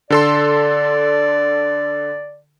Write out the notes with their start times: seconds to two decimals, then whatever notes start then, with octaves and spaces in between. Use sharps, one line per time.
0.10 D3 A4 D5 C6